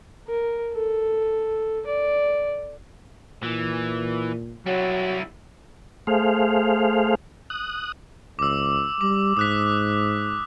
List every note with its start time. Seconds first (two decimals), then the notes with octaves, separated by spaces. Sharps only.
0.28 A#4
0.73 A4
1.87 D5
3.43 A#2 E3
4.66 F#3 G3 E4
6.07 A3 G#4 C5 F5
7.50 D#6 F#6
8.39 C#2 D6 E6
9.01 G3 D6
9.37 G#2 D#6 F#6 B6